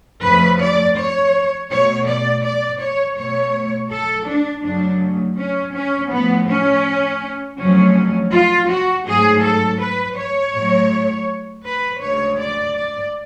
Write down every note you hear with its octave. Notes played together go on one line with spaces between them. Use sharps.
F2 C#3 F3 A3 B4
D5
C#5
B2 A3 C#5
D5
D5
C#5
B2 A3 C#5
A4
D4
F#2 C#3 F#3 A3 D4
C#4
C#4
A2 F3 A3 B3
C#4
F2 C#3 F#3 A3 C#4
F4
F#4
G#2 F#3 A3 G#4
A4
B4
C#5
A2 F#3 A3
B4
D2 C#3 G#3 C#5
D5
D5